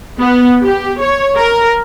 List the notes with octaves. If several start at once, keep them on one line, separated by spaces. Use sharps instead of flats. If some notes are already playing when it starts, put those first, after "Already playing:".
B3
G4
C#5
A#4